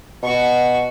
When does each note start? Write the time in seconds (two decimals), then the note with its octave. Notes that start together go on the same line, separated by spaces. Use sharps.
0.23 B2 F#4 C#6